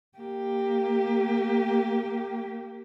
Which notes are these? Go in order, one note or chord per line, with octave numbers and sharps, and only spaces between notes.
A#3 G4